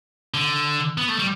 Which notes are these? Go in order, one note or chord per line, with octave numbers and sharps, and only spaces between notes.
D3
B3
A3
G3